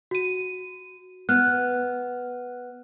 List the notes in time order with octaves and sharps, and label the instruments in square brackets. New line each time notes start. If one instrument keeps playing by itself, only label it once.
[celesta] F#4 D#7
[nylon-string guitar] B3 [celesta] F6 F#6